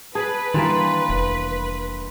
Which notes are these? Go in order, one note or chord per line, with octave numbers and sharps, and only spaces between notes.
G#4 B4 A5
D#3 E3 G3 A#3 D4 C6 A6
F1